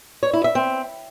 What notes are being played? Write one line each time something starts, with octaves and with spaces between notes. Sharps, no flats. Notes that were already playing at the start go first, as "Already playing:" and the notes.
C#5
E4
E5
C4